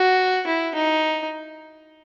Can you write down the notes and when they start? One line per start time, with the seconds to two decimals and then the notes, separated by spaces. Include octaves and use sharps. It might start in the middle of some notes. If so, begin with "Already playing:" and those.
Already playing: F#4
0.47 E4
0.74 D#4